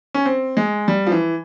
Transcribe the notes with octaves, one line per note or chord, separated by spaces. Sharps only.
C#4
C4
G#3
G3
F3
E3